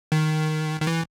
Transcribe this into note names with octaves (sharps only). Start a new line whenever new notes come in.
D#3
D#3
E3